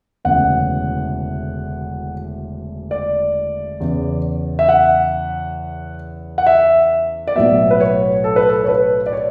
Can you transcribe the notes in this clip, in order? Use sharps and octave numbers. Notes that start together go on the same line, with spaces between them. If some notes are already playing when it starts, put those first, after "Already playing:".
E1 D2 C#3 E3 F#5
D5
E2 C#3 E3
E5
F#5
F#5
E5
D5
B1 A2 F#3 B3 E5
B4
C#5
A4
B4
A4
C#5
B4
D5
C#5